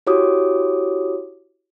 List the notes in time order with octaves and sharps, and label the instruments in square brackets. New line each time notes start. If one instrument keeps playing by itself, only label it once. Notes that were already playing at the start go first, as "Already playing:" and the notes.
[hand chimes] E4 F#4 G4 C#5 D6 D#6